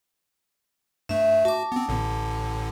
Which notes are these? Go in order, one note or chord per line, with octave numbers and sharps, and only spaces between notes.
G2 A3 E5
F#4 A5 D6
B3 C4
A1 A2 D3